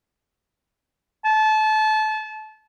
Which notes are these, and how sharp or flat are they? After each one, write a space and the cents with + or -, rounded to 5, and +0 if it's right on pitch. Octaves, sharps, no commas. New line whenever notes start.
A5 -25